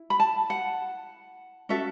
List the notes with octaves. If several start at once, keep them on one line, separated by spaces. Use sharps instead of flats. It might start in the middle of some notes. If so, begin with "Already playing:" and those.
Already playing: E4
B5
A5
F#5
C#4 F#4 A4 E5